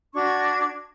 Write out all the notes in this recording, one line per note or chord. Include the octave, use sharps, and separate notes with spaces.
D4 F#4 C#6 G#6